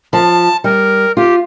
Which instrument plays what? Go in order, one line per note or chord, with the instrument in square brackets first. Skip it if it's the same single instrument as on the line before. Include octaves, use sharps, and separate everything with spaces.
[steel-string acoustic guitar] F3 [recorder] A5
[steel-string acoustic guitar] G3 [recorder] A#4
[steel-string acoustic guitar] F4 [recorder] G4